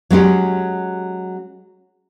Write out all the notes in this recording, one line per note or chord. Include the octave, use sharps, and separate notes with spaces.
F#3 G#3 C#4 G4